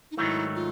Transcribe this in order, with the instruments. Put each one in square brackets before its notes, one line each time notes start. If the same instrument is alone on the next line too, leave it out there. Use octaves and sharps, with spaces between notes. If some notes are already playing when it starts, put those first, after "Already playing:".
[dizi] D#4
[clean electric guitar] G#2 D#3 F#3 A3 [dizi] E4
[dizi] F4